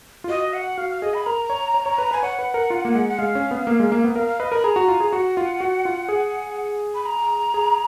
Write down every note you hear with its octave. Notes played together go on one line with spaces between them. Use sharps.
F4
F#4 D#5
F#5
F#4 F5
F5
G#4 D#5
B5
A#4 A#5
C#5
C#5
C#5
B4
B4 G#5
C#5 F#5
B4
A#4
F4
A#3
G#3
F#5
G#3 F5
C#4
B3
A#3
G#3
A#3
B3
A#4 F5
F5
B4 D#5
A#4 B5
G#4 A#5
F#4
F4
G#4
F#4 F#5
F4
F#4
F4
G#4
B5
A#5
G#4